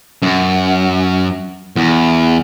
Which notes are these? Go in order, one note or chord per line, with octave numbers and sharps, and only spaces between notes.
F#2
E2